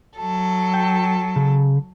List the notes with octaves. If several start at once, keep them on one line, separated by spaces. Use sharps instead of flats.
F#3 A4
G5
C#3